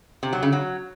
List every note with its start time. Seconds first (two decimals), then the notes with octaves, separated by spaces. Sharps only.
0.23 C3
0.33 F#3
0.43 C#3
0.52 F#3